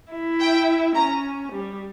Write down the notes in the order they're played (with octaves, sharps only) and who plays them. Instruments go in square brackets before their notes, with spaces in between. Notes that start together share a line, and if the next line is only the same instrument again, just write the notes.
[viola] E4
[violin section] G5
[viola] C#4 [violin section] A#5
[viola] G3